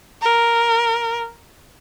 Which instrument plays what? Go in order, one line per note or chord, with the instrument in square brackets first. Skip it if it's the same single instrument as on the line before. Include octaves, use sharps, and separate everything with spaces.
[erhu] A#4